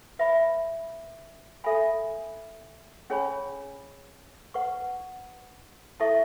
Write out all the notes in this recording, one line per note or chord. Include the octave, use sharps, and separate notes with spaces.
B4 E5 B5
A4 E5 G#5 B5
C#4 G#4 C#5 G#5 B5
B4 F#5 C#6
E4 A4 E5 A5 C#6